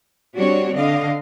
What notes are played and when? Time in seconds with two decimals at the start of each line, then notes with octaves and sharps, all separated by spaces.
0.36 G3 C4 D4 F#4 C#5
0.74 D3 D#5 F5